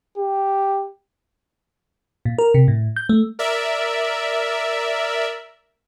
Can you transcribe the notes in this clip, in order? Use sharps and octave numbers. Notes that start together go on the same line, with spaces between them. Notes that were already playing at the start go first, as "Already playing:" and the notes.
G4
A#2
A#4
C3
A2
G6
A3
A#4 D5 E5